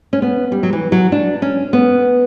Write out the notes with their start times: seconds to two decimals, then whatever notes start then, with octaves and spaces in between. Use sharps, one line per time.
0.13 C#4
0.22 B3
0.52 G3
0.63 F#3
0.73 E3
0.92 F#3
1.12 D4
1.42 C#4
1.73 B3